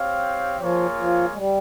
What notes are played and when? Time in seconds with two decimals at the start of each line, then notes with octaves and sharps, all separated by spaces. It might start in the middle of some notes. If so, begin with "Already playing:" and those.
Already playing: C4 G4 C#5 F5
0.59 F3 A#3 F4 G#4 C#5
0.99 F3
1.33 G#3
1.37 G3